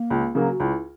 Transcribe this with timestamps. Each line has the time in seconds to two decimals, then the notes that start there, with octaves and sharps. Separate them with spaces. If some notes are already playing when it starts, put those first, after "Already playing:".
Already playing: A#3
0.10 C#2
0.35 C#3 F#3 A#3
0.51 F#4
0.60 C#2 E4